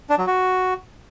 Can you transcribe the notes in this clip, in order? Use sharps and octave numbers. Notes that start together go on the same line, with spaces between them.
D4
F#3
F#4